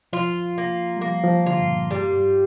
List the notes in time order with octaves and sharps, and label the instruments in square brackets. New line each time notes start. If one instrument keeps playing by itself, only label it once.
[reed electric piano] F3 [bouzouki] F4
[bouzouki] A#3
[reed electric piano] G3
[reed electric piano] F3 [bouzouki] A#3
[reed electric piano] F3
[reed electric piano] D3 [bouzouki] F4
[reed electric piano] G2
A#2
[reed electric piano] G2 [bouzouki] G3
[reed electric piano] G2